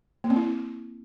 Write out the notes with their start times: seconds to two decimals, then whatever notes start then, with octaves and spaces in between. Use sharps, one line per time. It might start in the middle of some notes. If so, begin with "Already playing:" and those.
0.24 A#3
0.30 C4
0.36 E4